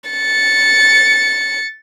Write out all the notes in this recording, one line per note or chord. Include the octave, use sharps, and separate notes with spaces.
A6 C#7